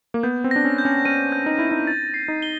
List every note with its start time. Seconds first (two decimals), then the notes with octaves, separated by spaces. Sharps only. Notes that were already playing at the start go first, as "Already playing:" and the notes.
0.14 A#3
0.23 B3 G6
0.44 C4
0.51 D4 A#6
0.65 C#4
0.78 G6
0.85 C#4
1.05 C#4 D#7
1.32 G6
1.46 D#4
1.59 E4 A#6
1.71 D#4
1.87 A6
2.14 C7
2.28 D#4
2.42 G7